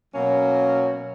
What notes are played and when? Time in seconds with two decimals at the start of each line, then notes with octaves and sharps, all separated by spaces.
0.15 B2 F#3 A#3 C#4